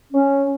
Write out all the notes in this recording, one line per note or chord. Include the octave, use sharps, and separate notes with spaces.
C#4